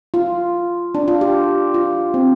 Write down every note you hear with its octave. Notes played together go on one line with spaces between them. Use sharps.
F4
D4
F4
G4
F4
C4